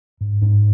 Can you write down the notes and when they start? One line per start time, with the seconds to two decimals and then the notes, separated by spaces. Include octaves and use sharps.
0.21 G#2
0.41 G#2